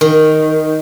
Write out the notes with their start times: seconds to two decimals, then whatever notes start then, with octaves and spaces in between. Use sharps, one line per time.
0.01 D#3